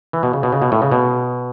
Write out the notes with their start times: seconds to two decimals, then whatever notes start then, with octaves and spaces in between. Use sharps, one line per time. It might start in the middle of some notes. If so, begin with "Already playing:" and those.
0.13 E3
0.23 B2
0.33 C#3
0.43 B2
0.52 C#3
0.62 B2
0.72 A2
0.82 C#3
0.92 B2